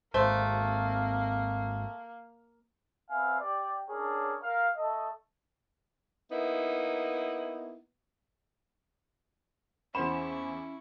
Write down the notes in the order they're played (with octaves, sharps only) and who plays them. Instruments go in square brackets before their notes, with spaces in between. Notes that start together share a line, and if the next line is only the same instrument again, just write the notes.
[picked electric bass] G#1 [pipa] A3 C5 [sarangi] A#3
[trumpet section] B3 C4 E5 F5 G#5
G4 D5
C#4 D4 G#4 A#4 C#5
A#4 F5
A3 A4 D#5
[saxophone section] A#3 B3 D#4 E4
[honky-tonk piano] E2 E7 [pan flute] C#4 [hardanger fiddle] E4 C#6 [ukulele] C5 F#5 B5